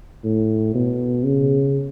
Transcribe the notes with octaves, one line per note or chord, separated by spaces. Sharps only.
A2
B2
C#3